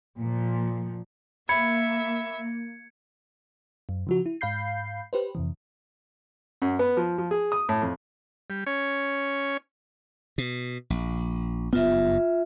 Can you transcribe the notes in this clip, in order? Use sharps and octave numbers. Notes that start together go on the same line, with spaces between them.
A#2 F3
A#3 E5 B5 G#6 C#7
F#2
C#3 F3 F#4
E4
G#2 F5 B5 G6 C7
G4 B4 C5
F2 C3 E3
F#2
B3
F3
F3
G#4
D#6
A2
F2
G3
C#4 C#5 G#5
B2
A#1
F#1 G2 B3 F4 E5